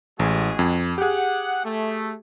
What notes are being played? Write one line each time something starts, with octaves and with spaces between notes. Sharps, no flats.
A1 G#3 F#4 G#4
F2
G4 G#4 F#5
A3